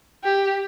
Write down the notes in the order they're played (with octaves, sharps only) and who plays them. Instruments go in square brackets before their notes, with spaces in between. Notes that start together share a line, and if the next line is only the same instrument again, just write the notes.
[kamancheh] G4